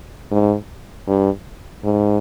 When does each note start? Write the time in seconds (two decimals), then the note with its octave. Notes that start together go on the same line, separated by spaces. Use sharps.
0.31 G#2
1.07 G2
1.84 G#2